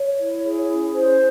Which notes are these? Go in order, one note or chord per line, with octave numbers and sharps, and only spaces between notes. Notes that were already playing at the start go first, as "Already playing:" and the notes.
Already playing: C#5
E4
G#4
C#4
C5